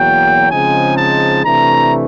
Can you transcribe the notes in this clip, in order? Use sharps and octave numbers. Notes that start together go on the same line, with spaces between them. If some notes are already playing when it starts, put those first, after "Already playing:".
Already playing: E2 B2 F#3 A#3 G5
C#3 F3 G#3 C4 D#4 G#5
A5
C3 E3 A3 D4 A#5